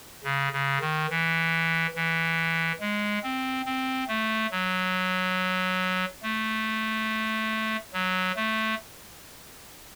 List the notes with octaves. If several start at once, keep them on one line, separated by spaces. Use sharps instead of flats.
C#3
C#3
D#3
E3
E3
G#3
C4
C4
A3
F#3
A3
F#3
A3